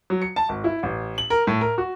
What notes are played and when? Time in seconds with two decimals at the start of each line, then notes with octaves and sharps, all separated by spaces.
0.10 F#3
0.22 C#7
0.36 A5
0.49 G#1
0.64 E4
0.83 A1
1.18 F#7
1.30 A#4
1.47 A2
1.61 A#4
1.78 F#4